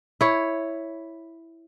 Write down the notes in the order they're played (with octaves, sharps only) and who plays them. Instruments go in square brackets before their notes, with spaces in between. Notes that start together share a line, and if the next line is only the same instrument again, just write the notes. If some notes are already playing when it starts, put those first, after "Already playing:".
[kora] E4 C#5